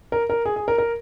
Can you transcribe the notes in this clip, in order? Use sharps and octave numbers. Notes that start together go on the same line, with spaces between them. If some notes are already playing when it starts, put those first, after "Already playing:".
A#4
A#4
G#4
G#4
A#4
A#4